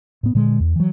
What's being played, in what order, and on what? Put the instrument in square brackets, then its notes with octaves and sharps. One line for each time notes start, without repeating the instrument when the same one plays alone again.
[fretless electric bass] A2 B3
A#2 D3 G#3
E2
E3 F#3